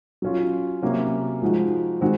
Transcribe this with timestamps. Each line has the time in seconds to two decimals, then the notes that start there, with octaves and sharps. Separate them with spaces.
0.22 F#3 C#4 F4
0.82 C3 F#3 A#3 C#4 F#4
1.42 F3 G#3 D#4 F#4
2.01 D#3 G#3 C4 F#4